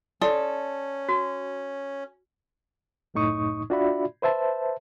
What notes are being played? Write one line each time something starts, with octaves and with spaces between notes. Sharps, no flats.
C#4 A4 D5 C6 D#6
F#4
C2 F#2 A2 D#4 C#6 D#6
D4 F4 F#4 D5 E5 B5
B4 C5 E5 A5